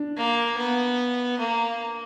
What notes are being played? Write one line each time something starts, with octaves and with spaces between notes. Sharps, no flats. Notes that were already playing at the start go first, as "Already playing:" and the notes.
Already playing: D4
A#3
B3
A#3